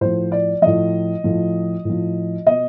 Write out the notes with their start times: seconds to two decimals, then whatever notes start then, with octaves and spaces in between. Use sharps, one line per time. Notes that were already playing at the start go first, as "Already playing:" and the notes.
0.01 A2 F3 C5
0.32 D5
0.62 A2 F3 D#5
1.24 A2 F3
1.85 A2 F3
2.47 B2 D#5